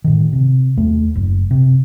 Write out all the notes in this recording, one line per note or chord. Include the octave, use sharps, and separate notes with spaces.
A2 D#3
C3
D#2 A3
F#1
C3